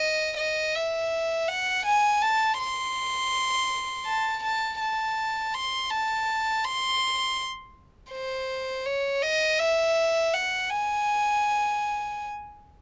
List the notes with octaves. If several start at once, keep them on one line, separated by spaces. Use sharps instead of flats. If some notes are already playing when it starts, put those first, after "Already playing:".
Already playing: D#5
D#5
E5
F#5
G#5
A5
C6
A5
A5
A5
C6
A5
C6
C5
C#5
D#5
E5
F#5
G#5